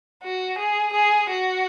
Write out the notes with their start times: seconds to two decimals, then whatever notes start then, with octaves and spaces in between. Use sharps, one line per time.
0.23 F#4
0.59 G#4
0.94 G#4
1.30 F#4